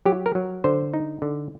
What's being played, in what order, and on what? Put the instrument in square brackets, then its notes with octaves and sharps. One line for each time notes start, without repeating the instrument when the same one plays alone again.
[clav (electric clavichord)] F#3 G4
A#4
F#3
D3 C5
D#4
D3